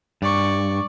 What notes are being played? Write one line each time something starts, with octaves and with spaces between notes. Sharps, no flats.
G2 D5 C#6